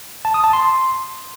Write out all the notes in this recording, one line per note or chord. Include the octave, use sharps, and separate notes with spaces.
A5
D#6
A5
C6